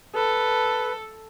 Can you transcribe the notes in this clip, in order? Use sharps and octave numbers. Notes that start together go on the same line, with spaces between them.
A4 B4